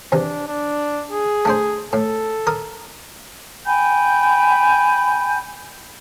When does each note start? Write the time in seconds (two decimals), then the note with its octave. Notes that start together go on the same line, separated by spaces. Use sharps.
0.12 E2 C3 D4
0.47 D4
1.11 G#4
1.45 A3 D4 C5
1.93 A2 A4
2.47 A#4 D#6
3.65 G5 G#5 B5 G6